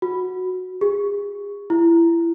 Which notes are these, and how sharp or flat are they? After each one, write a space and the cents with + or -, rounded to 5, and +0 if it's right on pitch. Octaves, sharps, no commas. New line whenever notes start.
F#4 -5
G#4 -35
E4 +25